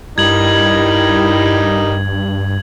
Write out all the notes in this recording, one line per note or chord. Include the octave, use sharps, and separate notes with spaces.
G2 D#3 G3 D#4 E4 G#6 F#7